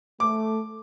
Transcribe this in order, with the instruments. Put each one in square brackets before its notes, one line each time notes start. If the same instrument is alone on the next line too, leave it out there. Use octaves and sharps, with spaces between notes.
[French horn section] A3 [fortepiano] D6